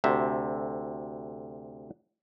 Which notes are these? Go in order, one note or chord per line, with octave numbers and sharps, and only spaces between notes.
D2 C3 E5